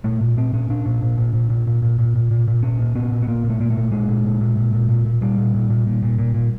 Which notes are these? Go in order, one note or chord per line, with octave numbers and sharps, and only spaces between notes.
A#2 A3
A#2
A#2 C4
A#2 C#4
A#2 D4
A#2
A#2
A#2
A#2
A#2
A#2
A#2
A#2
A#2
A#2
A#2
A#2 C#4
A#2
A#2 B3
A#2
B3
A#2 A#3
A#2
A3
A#2 A#3
A3
A#2
A#2 G#3
A#2
A#2
A#2
A#2
A#2
A#2
A#2
A#2 G3
A#2
A#2
A#2
A#2
A#2
A#2
A#2